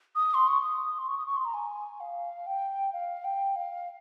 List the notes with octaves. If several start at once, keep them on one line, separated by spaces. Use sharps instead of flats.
D#6
C6
C#6
D#6
C6
C#6
D#6
C#6
C6
A#5
G#5
F5
G5
F5
G5
F5